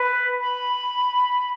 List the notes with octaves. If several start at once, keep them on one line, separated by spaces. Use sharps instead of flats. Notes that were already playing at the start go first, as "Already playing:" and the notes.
Already playing: B4
B5